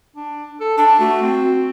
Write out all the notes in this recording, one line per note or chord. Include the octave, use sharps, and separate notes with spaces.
D4
A4
D4 A5
A3 F#4
C4